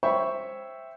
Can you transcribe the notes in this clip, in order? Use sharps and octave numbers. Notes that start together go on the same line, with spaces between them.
C5 C#5 E5 G5 B5 C#6